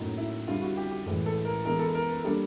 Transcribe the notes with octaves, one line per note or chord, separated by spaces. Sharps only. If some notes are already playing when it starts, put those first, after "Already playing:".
Already playing: A2 F#3 A#3 C#4 D#4
E4
D3 G3 C4 E4 F4
F#4
G4
G4
A2 E3 G#3
A4
A#4
E3 G#3 B3 A#4
A4
A#4
B4
G3 A#3 D4 G4 A4